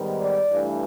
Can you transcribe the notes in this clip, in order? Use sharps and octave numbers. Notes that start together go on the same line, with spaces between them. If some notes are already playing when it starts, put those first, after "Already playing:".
Already playing: G#2 D#3 G3 B3
D5
G2 E3 A3